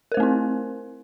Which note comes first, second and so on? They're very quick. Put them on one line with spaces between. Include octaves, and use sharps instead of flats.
A#4 C5 A3 C4 E4